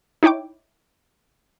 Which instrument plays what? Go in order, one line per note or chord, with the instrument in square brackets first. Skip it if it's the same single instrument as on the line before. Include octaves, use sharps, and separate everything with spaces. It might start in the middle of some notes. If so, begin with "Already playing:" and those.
[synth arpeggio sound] D#4 E4 C#5 G5 D6